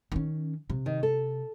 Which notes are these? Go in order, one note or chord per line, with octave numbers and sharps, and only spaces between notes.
D#3 C#4
C3
D#3
A4